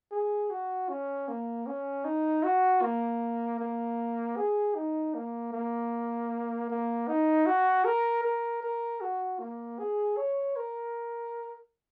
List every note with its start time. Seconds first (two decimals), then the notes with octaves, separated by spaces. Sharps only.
0.12 G#4
0.50 F#4
0.89 C#4
1.28 A#3
1.67 C#4
2.05 D#4
2.44 F#4
2.82 A#3
3.60 A#3
4.37 G#4
4.75 D#4
5.15 A#3
5.53 A#3
6.70 A#3
7.08 D#4
7.46 F#4
7.85 A#4
8.24 A#4
8.63 A#4
9.01 F#4
9.39 A#3
9.79 G#4
10.17 C#5
10.56 A#4